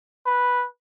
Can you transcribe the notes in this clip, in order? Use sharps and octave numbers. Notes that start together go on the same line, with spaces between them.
B4